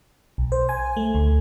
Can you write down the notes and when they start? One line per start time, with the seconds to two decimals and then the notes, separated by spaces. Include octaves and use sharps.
0.38 B1
0.52 C5
0.69 G#5
0.97 A3
1.15 D2